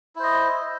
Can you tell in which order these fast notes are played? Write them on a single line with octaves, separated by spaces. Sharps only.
E4 C5 D#5